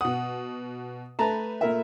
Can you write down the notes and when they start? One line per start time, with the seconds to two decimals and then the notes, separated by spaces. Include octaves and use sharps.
0.01 B2 F#5 D#6
1.19 A3 B4 A5 A#5
1.61 A#2 A#4 E5